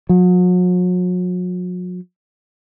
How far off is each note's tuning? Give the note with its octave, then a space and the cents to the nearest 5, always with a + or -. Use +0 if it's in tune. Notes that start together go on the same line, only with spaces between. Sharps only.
F#3 -40